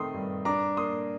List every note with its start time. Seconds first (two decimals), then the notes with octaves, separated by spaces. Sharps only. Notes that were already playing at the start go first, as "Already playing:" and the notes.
Already playing: D#3 A3 C4 C6 D#6
0.14 G2
0.45 D4 A#5 D6
0.77 A#3 C6 D#6